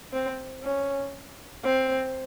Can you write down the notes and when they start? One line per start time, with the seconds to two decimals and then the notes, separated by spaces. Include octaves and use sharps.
0.13 C4
0.63 C#4
1.64 C4